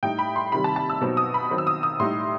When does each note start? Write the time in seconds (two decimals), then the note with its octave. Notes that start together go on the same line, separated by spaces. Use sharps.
0.03 A2 G3 D#4 G5
0.19 B5
0.36 C6
0.52 C3 D#3 G3 B5
0.64 A5
0.76 A5
0.90 E6
1.01 B2 F#3 C4 D#4
1.17 D#6
1.34 B5
1.50 D#3 F#3 C4 D#4
1.58 E6
1.67 D#6
1.83 D#6
2.00 A2 G3 D#4 C6